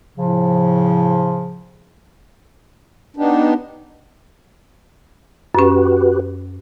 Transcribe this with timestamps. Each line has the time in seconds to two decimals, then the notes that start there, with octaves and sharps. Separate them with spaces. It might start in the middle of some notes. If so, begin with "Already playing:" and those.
0.18 A2 C#3 F3
3.17 B3 D4 D#4 G4
5.55 F#2 C#4 F#4 G4 B4